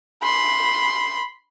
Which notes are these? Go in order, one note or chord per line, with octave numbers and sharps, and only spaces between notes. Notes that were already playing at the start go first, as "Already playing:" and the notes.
B5 C6